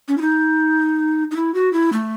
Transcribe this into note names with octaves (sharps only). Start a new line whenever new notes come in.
C#4
E4
D#4
D#4
E4
F#4
E4
A3